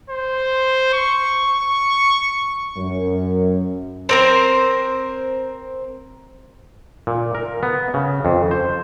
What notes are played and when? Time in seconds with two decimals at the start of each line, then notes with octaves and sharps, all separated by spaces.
0.10 C5
0.94 C#6
2.77 F#2
4.09 C4 A#4 C5
7.07 A#2
7.35 A#4
7.63 B3
7.94 C#3
8.25 F2
8.51 C5